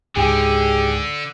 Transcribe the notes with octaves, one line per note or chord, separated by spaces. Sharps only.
C#2 G#2 D3 G4 G#4